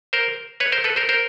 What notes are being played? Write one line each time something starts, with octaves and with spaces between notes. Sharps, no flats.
A#4 C5
B4 C#5
A#4 C5
A4 B4
A#4 C5
A#4 C5